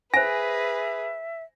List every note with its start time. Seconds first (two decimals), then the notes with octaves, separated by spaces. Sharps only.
0.14 G#4 B4 C5 E5 G#5 A#6